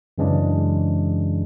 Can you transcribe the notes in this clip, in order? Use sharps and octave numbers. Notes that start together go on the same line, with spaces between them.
F#2 C#3 E3 G#3 D4